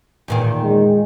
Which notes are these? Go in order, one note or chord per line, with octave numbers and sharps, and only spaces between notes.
E2 A#2 D#3
G#3